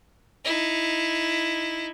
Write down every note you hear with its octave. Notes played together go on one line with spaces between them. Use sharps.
D#4 E4